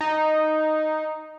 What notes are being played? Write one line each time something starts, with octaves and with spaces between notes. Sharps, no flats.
D#4